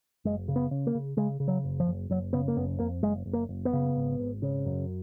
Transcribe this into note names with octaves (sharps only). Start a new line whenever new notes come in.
F#1 G#3
C#3
B3
C#3
A#3
C#3
C#3 G#3
C#3
F#3
F#1
F3
F#1
F#1 F#3
C#3 B3
A#3
F#1 B3
F2 A#3
F#1 G#3
F#1
A#3
F#1
B3
C#3
G#1
G#1
C#3
F#2